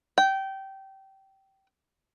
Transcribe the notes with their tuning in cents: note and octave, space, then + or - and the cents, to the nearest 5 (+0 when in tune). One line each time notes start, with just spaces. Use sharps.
G5 -20